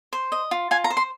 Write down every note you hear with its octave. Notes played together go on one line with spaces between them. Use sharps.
C5
D#5
F4
F4 G#5
A#5
C5
C6